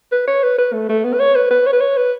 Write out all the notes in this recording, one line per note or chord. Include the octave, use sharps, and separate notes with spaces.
B4
C#5
B4
B4
A3
A3
B3
B4
C#5
B4
B4
C#5
B4
C#5
B4